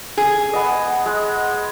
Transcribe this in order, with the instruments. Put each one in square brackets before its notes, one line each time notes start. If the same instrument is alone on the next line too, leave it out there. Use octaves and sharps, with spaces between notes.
[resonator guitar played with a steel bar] G#4
[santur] B3 D#5
G#3